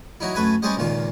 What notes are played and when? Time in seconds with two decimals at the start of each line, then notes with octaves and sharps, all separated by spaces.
0.20 F#3 D#4 E4
0.35 F#2 A3 B4 G#5
0.62 G3 G#3 C#4 G4 C5 D#5
0.77 C#2 A#2 D#3 F4